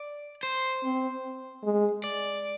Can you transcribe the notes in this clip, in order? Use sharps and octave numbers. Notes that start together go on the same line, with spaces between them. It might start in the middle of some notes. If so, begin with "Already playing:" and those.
Already playing: D5
C5
C4
G#3
D5